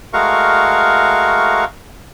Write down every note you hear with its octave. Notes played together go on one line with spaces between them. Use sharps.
G#3 A3 F#4 A#4 F5 C#6